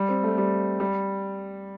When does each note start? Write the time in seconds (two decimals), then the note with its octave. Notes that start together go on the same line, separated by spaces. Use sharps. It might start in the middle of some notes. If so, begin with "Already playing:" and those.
Already playing: G3
0.09 C4
0.23 A3
0.38 G3
0.80 G3